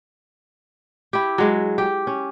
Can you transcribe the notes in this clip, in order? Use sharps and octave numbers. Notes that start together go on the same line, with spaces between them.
E4 G4
F#3 G#3
G4
C#4